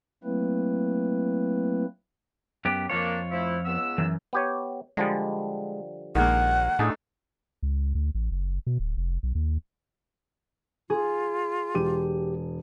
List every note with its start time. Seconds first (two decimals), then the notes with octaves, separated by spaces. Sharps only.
0.24 F#3 A3 A#3 C4 E4 B4
2.65 F#2 B3 G4
2.90 F2 A#3 D4 F4 C#5
3.31 F3 A3 E4
3.66 C#2 B3 E6
3.98 F#2 E3
4.33 B3 G4 C#5
4.97 D3 F3 G3 G#3
6.15 A#1 D#3 G#3 A#3 F#5
6.79 A2 A3 D4 D#4 G#4
7.63 C#2
7.95 D2
8.15 A1
8.31 F#1
8.67 B2
8.79 D1
8.97 F1
9.23 B1
9.35 D#2
10.90 F4 G#4
11.75 E1 G4 D#7